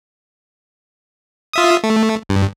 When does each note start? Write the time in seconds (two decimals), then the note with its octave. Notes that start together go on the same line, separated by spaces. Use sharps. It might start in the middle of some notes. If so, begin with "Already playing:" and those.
1.53 F4 E5 D#6
1.84 A3
2.29 G2